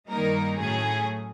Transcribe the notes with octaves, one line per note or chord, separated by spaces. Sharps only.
G2 D#3 G3 A#3 D#4 A#4
A2 F#3 A3 C#4 G#4